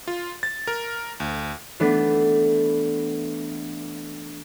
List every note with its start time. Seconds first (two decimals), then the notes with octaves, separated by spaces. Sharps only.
0.08 F4
0.43 A6
0.67 A#4
1.20 D2
1.80 E3 A3 B3 D4